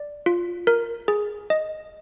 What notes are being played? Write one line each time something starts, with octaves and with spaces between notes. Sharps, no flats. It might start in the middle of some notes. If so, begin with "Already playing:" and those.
Already playing: D5
F4
A#4
G#4
D#5